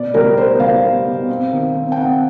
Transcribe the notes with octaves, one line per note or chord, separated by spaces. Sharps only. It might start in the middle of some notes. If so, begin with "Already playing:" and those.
Already playing: B2 D5
G3 A#4
B3 C5
G3 F5
B3
B2
C4
D#3
C4
G5
C4 F#5